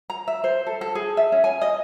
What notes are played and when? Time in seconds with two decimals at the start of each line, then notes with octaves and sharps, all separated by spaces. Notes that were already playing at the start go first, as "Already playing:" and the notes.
0.10 A#5
0.28 E5
0.44 C5
0.66 A4
0.81 A4
0.95 G#4
1.17 E5
1.32 C#4
1.44 G#5
1.61 D#5